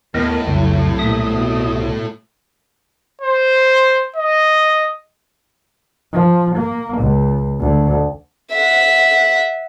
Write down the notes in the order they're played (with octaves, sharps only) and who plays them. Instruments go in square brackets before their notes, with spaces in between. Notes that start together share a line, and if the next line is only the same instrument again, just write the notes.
[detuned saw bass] D#2 [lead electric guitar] A2 [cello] B3 B4 [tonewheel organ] A#4 D#5
[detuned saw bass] C2 [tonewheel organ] F2 C#3 [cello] F#3
[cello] A#2 A3 [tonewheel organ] E5 D#6
[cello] B2
[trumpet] C5
D#5
[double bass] F3
A#3
C#2
D2
[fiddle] E5 F#5